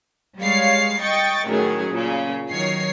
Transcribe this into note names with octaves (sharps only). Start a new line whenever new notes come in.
G3 G#3 C#5 F5 C7
D#5 G5 C#6 A6
A2 D#3 F#3 C#4 G#4
A#2 C#3
D#3 F#3 C#5 C7